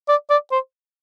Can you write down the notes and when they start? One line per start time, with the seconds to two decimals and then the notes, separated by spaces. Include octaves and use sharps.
0.09 D5
0.30 D5
0.52 C5